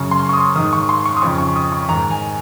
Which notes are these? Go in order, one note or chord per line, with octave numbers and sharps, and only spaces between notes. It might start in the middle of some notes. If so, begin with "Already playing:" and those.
Already playing: F#2 C#3 C#6
C6
C#6
D#6
G#2 D#3 D#6
C#6
C6
C#6
D#6
F2 C#3 C#6
C#6
D#6
C#6
G#2 D#3 A#5
G#5